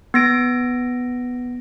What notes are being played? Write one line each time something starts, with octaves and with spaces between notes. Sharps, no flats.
B3 A#6 D7